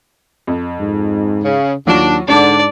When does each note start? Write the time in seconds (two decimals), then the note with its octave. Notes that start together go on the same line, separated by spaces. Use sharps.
0.47 F2
0.80 G#2
1.44 C#3
1.87 D#2 F#3 D4 F4 F#4
2.28 G#2 D3 D4 D5 A5 D6